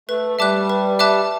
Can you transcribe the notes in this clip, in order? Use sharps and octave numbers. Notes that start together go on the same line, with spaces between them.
A3 B4
G3 E5 A5 D6 F#6
B4
E5 A5 D6 F#6